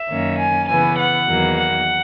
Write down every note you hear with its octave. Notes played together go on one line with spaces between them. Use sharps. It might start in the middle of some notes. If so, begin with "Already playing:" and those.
Already playing: E5
F#2 D#3 A#3 C#4
G#5
C#3 E3 B3 G#5
F#5
E2 D#3 F#3 A#3
F#5